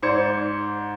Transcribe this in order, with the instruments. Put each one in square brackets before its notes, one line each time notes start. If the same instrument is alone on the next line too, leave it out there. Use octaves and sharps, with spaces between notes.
[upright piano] G#2 C5 D5 G#6 C#7